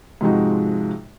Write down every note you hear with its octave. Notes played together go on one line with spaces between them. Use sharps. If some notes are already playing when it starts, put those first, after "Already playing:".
G#2 C3 F3 G#3 D#4 F#4